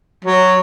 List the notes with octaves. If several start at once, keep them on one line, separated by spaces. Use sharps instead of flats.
F#3